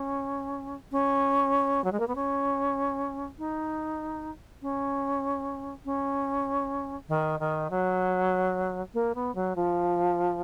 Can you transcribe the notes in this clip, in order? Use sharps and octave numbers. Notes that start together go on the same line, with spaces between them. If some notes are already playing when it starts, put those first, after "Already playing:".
Already playing: C#4
C#4
F#3
G#3
A#3
B3
C#4
D#4
C#4
C#4
D#3
D#3
F#3
A#3
B3
F#3
F3